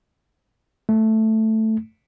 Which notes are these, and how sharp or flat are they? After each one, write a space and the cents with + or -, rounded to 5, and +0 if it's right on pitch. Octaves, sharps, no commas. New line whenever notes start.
A3 +0